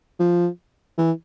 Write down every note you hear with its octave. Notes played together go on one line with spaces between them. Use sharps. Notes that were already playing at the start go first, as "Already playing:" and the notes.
F3
E3